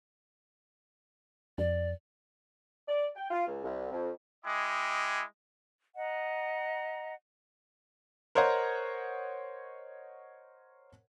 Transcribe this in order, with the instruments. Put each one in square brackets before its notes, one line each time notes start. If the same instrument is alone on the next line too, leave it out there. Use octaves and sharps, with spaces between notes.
[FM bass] F2 [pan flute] D5
[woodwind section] D5
G5
F4
C#2
C2
F2
[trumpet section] G#3 E4 D#5 G5 D6
[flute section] D#5 F#5 A#5
[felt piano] A#4 C5 C#5 D#5 F#5